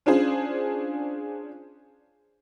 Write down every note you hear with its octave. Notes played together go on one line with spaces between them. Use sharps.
C#4 D4 F4 G#4 C5